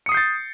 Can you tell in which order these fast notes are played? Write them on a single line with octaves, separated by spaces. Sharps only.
C#7 D#6 C7 G6 A6